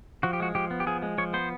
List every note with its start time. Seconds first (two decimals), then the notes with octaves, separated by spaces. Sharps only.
0.23 F3 F#4
0.33 G4
0.40 G#3 F#4
0.55 F3 G4
0.71 B3
0.80 G4
0.87 F3 G#4
1.02 G#3
1.18 F3 C#5
1.34 B3 C5